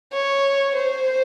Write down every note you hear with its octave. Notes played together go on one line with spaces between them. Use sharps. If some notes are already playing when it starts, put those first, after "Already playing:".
C#5
C5